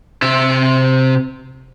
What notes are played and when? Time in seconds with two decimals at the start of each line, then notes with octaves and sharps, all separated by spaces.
0.22 C3 E5